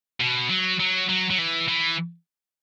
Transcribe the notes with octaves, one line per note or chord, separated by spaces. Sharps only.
B2
F#3
F#3
F#3
F#3
E3
E3